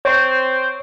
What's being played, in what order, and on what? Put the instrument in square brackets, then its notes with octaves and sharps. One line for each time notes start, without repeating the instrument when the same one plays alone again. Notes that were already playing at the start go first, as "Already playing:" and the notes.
[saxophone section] C4 C5 [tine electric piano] C#5